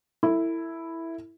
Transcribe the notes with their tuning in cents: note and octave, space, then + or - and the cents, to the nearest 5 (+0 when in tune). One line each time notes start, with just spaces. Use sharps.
E4 +0 A4 +35